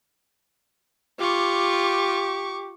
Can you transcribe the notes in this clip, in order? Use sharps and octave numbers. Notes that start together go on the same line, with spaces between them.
F4 G4 C#6 D6